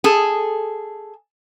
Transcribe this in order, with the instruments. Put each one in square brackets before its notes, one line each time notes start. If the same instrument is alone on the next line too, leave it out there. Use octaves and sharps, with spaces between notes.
[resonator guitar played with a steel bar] G#4 A4